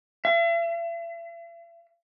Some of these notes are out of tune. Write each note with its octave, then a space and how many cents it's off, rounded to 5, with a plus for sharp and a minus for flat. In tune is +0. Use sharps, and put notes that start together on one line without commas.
E5 +45